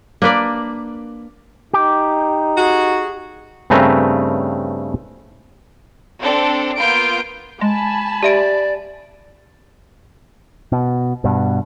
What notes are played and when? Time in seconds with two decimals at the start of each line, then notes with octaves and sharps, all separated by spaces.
0.22 A#3 D4 B4 D5
1.73 D#4 G4
2.58 F#4 G#4
3.70 G2 C#3 A3 C4 B4 A#5
6.21 C4 D4 A4
6.77 A#3 B3 F4 G6 D7
7.61 G#3 G#5 A5 B5
8.23 G4 D5 E5 D7
10.72 B2
11.24 G2 B2